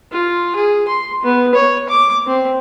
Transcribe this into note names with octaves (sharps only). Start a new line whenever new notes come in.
F4
G#4
C6
B3
C#5
D6
C4